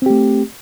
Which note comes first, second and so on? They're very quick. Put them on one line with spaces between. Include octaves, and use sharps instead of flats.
C4 G4 A3